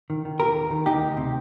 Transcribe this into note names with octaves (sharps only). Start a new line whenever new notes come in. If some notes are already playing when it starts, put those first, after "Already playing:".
D#3
D#3
D#2 G4 A#4
D#3
D#3
D2 D#4 G4
D2
C3